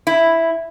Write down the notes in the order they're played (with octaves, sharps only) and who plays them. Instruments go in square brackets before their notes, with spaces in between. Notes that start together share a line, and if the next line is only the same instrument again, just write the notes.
[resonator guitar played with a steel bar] E4